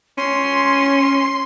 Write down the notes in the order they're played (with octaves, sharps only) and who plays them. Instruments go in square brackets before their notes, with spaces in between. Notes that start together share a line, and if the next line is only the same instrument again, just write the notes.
[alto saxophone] C#4 [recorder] C6